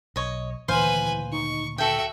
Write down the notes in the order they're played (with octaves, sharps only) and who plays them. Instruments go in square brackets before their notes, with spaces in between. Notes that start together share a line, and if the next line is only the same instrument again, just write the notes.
[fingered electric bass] B1 [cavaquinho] C#5 D#5
[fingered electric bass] D2 A#2 D#3 [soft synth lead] E3 [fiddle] B4 G#5 [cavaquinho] C5 F5
[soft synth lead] D#4 [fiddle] C#6
[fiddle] F#4 E5 [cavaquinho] A4 G5 [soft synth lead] D7